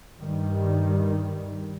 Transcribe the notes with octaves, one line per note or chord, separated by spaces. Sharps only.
G2 D#3 G3